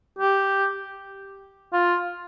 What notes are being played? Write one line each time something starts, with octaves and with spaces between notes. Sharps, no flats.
G4
F4